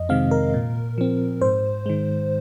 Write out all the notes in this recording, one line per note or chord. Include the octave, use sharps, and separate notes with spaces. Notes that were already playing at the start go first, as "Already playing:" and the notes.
Already playing: F2 D#5
C3 D#3 G#3 C4 F5
A#4
A#2
F3 C4
G#2 C5
D#3 G#3